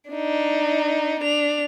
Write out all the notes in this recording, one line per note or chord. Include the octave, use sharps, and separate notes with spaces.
D4 D#4
D4 F7